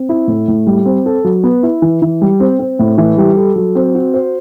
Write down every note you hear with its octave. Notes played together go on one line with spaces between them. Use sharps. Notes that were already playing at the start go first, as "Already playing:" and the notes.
Already playing: C4
E4
A2
A2
G3
C4
A4
F#3
B3
E4
E3
E3
G3
C4
C4
A2
E3
G3
A4
F#3
C4
F#4
C5